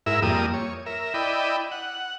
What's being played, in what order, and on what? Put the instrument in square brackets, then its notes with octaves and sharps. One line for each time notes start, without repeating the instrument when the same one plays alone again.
[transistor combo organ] G#2 E4 A#4 E5
F2 G3 A#3 D#6
C#5
A#4 E5
E4 D5 D#5 G5 B5
F#5